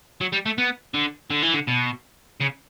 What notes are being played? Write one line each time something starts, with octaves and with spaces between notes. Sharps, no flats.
F#3
G3
A3
B3
D3
D3
E3
D3
B2
C#3